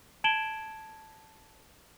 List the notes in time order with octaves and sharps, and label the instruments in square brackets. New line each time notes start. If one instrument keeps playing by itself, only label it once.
[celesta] A5 G#6 D7 E7 F#7 G7